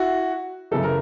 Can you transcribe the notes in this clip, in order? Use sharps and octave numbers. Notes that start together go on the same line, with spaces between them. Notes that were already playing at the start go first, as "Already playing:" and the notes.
Already playing: E4 F#4
F#2 C#3 E3 A4
A#4